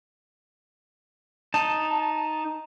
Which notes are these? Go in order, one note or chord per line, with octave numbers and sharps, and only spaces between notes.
D#4 A5